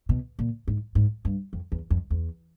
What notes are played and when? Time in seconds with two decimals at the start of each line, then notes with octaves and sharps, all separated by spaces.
0.09 B2
0.39 A#2
0.68 G#2
0.95 G#2
1.25 G2
1.53 F2
1.72 E2
1.90 F2
2.10 E2